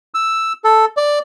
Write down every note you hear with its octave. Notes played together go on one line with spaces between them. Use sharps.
E6
A4
D5